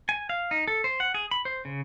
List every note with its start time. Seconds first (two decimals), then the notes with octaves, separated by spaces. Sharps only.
0.09 G#5
0.30 F5
0.51 D#4
0.68 A4
0.84 C5
1.00 F#5
1.14 G#4
1.31 B5
1.45 C5
1.65 C#3